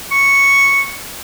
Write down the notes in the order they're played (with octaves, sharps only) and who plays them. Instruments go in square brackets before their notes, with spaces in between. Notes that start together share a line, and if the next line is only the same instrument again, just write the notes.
[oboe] C#6